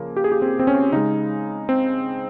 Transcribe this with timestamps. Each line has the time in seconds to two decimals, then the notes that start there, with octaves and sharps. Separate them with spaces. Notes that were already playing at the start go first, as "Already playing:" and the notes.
Already playing: C#3 F3 A#3
0.17 G4
0.24 G#4
0.32 G4
0.42 C4
0.59 C4
0.67 C#4
0.92 C#3 G#3 D#4
1.69 C4